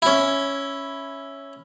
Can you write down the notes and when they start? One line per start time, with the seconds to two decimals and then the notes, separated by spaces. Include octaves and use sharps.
0.02 C#4 E4